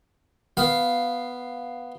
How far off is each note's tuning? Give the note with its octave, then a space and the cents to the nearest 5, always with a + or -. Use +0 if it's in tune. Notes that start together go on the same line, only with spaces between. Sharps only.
B3 +0 F5 +0